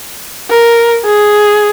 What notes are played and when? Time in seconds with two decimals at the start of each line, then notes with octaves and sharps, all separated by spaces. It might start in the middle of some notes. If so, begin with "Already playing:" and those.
0.50 A#4
1.06 G#4